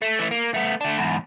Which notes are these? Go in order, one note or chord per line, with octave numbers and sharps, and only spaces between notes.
A3
E3 A3
A#3
A3 B3
A3 D4
E2 G#2